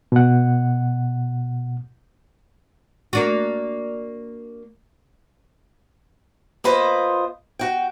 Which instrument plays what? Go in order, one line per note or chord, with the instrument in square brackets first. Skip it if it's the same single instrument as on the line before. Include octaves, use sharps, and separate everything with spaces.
[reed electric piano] B2 F#5
[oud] A#3 D4 F#4
[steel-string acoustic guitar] A#3 F4 B4 C5 D#5
F#4 G5